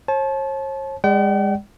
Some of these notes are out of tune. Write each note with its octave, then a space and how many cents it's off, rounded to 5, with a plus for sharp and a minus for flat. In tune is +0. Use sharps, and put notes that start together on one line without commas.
C#5 -45 A5 -30
G#3 -35 D5 -5 G5 -45